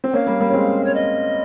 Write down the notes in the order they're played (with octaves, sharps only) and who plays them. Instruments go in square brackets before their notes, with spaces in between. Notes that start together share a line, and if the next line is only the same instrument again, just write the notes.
[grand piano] C4
[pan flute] G5
[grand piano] A#3 C#4 [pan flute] F5
[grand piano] G3 A#3
G3 A#3
C#4
G#3 C4
[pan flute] C#5
D#5